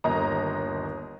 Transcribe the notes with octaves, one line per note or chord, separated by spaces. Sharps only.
G1 D#2 D#5 A#5